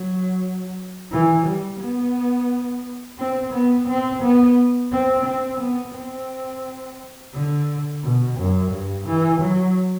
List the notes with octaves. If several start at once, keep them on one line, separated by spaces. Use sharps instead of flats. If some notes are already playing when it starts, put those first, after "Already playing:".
Already playing: F#3
E3
G3
B3
C4
B3
C4
B3
C4
C4
B3
C4
D3
B2
F#2
G2
E3
F#3